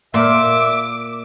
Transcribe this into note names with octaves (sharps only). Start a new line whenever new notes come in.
A#2 A#3 E5 D6